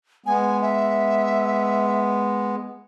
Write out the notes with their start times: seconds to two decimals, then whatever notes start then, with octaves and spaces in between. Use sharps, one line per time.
0.26 G#3 B3 G#5
0.62 E5